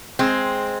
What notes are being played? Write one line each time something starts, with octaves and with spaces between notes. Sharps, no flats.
G#3 C4